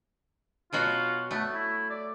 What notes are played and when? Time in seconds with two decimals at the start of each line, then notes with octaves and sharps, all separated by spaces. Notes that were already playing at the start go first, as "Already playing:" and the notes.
0.73 B2 F#3 F4 F#4
1.31 A3 B3
1.54 E4
1.90 D5